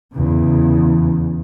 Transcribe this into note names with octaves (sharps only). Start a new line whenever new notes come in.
E2 C#3